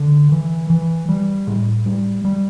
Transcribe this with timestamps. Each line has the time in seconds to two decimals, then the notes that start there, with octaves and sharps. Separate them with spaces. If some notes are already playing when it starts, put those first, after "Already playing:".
Already playing: D3
0.32 E3
0.70 E3
1.08 G3
1.47 A2
1.86 G3
2.25 G3